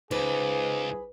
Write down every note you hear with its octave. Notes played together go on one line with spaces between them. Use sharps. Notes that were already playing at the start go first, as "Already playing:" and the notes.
C#2 D#4 G#4 B4 C5 D6